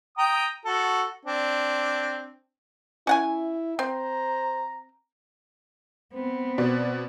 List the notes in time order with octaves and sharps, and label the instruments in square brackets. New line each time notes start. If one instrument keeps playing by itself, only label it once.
[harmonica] G5 A#5 D#6
F#4 A4
C4 D4
[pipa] C#4 F#5 G#5 [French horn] E4
[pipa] C4 [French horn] C5 [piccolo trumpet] A#5
[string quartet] B3 C4
[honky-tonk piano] B2 D5